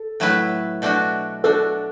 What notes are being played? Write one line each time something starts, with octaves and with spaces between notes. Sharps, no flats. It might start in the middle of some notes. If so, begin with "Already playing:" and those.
Already playing: A4
A2 F#3 A3 E4 B4
B2 A3 D4 F#4
B2 A3 D4 F#4 A4